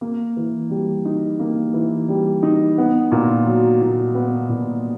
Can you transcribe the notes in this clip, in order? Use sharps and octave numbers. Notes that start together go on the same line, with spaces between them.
A#3
E3
G3
D#4
A#3
E3
G3
D#4
B3
A#2
F#3
A#2
B3
A#2